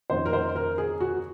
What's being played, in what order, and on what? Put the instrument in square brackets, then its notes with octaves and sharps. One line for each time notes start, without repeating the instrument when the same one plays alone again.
[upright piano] F2 D#3 A#3 C#4 C5
A#4
C5
A#4
G#4
F#4